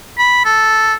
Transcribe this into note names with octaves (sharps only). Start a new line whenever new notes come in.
B5
A4